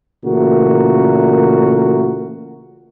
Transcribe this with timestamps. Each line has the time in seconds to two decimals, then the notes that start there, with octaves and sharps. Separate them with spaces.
0.25 A#2 C#3 E3 A3 F#4 A#4